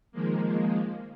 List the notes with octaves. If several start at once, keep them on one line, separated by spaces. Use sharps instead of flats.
D#3 F3 G#3 A#3